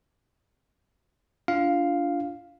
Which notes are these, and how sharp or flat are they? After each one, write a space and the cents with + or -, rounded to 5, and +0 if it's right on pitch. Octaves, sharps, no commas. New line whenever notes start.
D4 -30 F4 -30 F5 +0